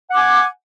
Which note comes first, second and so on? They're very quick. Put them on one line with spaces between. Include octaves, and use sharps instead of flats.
F#5 D6 G#5